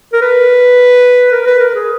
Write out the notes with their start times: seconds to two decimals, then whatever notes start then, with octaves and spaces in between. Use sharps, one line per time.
0.13 A#4
0.22 B4
1.32 A#4
1.47 B4
1.60 A#4
1.75 G#4